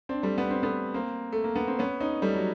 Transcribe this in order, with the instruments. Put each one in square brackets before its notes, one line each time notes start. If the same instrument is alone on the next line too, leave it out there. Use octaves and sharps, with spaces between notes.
[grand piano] C4 D4
G3 A3
B3
C4
A3 B3
A#3 C4
A3
A#3
B3
C4
B3 C#4
C#4 D#4
G3 A3
F#3